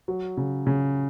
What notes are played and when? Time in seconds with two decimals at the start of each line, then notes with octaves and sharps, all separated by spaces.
0.08 F#3
0.37 C#3
0.67 C#3